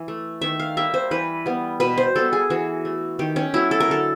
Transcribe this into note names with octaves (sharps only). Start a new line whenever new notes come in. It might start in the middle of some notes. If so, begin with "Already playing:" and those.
Already playing: E3
A3
D#3 E5
F5
G3 A#3 E5
C5
E3 B4
G3 B3
B2 B4
C5
G3 B3 A4
G#4
E3 F#4
A3
D#3 G4
C#4
F#3 A3 E4
A4
A#4
D3 A4